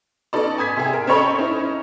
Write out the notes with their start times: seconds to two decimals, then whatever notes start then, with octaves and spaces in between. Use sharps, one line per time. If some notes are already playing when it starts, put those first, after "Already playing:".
0.33 B3 C#4 D#4 A4 D5
0.58 G#5 D#6 G#6 B6
0.76 C3 G#4
0.93 A#4
1.07 C4 C#4 A4 C#5 D#5 B5
1.38 C#4 D#4 E4